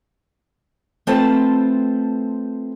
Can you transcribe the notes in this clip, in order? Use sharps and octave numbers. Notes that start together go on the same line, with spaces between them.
A3 C4 F4 B4 C5 A5